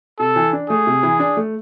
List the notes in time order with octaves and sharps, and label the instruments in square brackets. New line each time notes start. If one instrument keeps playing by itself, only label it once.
[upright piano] C3 [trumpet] A4
[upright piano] E3
D4
[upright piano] A3 [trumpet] G#4
[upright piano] C3
E3
D4
A3